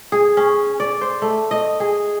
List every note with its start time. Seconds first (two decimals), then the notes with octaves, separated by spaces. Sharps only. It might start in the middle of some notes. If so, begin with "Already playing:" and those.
0.12 G#4
0.37 C#4
0.80 D5
1.01 C5
1.22 A3
1.51 D#5
1.80 G#4